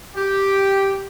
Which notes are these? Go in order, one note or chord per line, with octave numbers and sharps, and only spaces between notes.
G4